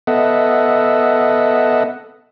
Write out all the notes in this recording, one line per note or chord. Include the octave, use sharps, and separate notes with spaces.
B3 A4 D#5 E5 F#5